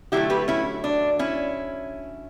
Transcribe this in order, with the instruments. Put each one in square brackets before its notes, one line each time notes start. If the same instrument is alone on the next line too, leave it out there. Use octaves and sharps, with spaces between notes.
[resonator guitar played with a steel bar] D3 F#3 A3 E4 G4
G4 B4
C#4 E4
D4
C#4 E4